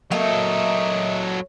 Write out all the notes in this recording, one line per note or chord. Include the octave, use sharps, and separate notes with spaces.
F#3 A3 A#3 A4 A#4 D#5